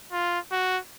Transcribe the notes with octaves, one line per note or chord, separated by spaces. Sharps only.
F4
F#4